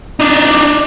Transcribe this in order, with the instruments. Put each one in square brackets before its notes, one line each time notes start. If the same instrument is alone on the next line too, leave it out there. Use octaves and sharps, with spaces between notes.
[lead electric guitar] D4 D#4